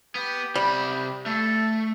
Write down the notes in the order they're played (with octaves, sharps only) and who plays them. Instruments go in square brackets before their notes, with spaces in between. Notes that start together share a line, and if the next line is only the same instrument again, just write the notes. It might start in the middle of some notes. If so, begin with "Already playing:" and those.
[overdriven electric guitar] B3 [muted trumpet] G4
[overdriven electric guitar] C3 B5 [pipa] G3
[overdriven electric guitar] A3 [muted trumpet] A4